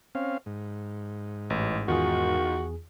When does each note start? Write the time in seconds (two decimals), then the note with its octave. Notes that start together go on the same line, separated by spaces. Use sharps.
0.15 C4 C#4 F5
0.46 G#2
1.50 A1
1.88 E2 D#3 F4 F#4 G#4